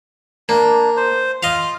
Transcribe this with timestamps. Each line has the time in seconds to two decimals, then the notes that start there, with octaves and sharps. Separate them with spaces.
0.49 A#3 D4
0.97 C5
1.43 F4 D#5 F5